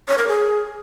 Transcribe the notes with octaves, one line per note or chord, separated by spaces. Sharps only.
C#5
A#4
G#4